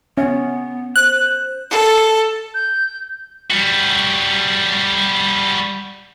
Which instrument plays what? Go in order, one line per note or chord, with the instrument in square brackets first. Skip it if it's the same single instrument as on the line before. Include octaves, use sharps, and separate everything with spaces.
[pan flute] B3 [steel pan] C#4
[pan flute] C5 [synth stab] F#6
[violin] A4
[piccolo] G6
[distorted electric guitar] G3 F#4